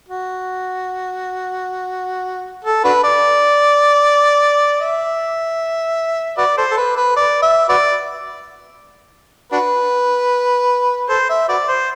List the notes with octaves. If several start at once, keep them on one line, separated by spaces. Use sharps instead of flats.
F#4
A4
D4 F#4 B4
D5
E5
F#4 B4 D5
A4 C5
A4
B4
B4
D5
E5
F#4 B4 D5
D4 F#4 B4
A4 C5
E5
F#4 B4 D5
C5